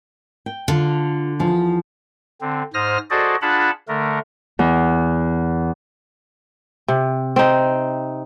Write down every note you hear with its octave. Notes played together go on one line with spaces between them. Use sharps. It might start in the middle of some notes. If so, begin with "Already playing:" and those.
G5
D3 F4
E2 F3
D3 C4
G#2 C5 D#6 F6 A#6
F#4 G#4 A4 C5 D5 D#5
D4 F4 G#4 F#5 A5 B5
D3 A3 A#4
E2
C3
C4 D#4